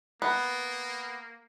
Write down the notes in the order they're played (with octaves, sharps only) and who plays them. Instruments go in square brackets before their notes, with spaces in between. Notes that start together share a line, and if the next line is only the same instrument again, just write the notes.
[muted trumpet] A#3 [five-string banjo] B3